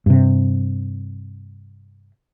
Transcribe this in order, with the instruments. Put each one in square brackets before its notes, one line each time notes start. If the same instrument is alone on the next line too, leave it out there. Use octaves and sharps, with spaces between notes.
[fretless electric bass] G2 C3